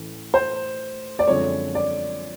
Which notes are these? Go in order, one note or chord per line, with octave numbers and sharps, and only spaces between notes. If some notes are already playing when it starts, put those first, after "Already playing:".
Already playing: A2 E3 C#4
C5
D5
F#2 D3 F3 G#3 C4 C#5
D5